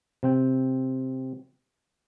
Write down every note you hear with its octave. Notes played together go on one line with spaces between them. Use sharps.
C3 C4 G5